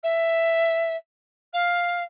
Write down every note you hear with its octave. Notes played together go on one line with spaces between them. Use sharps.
E5
F5